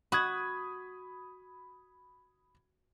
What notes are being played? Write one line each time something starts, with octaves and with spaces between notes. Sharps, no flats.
F#4 B5 D#6 G#6